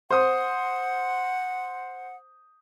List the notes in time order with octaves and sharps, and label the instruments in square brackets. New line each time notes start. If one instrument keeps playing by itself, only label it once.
[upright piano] C5 D#6 [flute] F#5